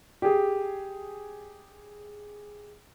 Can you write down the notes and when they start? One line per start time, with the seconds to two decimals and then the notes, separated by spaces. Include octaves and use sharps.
0.22 G4 G#4